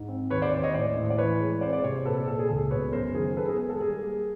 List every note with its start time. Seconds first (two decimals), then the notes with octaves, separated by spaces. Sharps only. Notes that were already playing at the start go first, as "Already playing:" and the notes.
Already playing: G#2
0.08 C4
0.30 D#2 B4 C#5
0.42 C5 D5
0.53 D#2
0.63 C#5 D#5
0.74 A2 C5 D5
0.96 A2
1.10 D5
1.18 E3 B4 C#5
1.40 G#3
1.61 C4 C5 D5
1.73 D5
1.84 C3 C#5
1.95 C5
2.05 A#2 A4 B4
2.16 A4
2.27 A#2 A4
2.39 G#4
2.49 C#2 A4
2.71 B2 B4 C#5
2.93 F#2 A#4 C5
3.15 D#3 G#4 A#4
3.37 B3 A4 B4
3.48 G#4 A#4
3.58 G#3 G#4
3.69 A4
3.80 G3 G#4 A#4
4.02 A#3